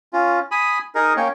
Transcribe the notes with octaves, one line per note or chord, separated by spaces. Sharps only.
C#4 F4
G#5 B5 D#6
D#4 G#4 A#4
A#3 C#4 C#5 G5